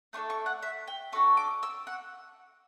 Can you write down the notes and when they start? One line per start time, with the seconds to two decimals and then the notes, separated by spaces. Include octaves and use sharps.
0.13 A3 D4 A4 C#6
0.30 C#6
0.46 F#5
0.62 E5
0.87 G5
1.12 D4 F#4 A4 C#6
1.37 D6
1.63 E6
1.87 F#5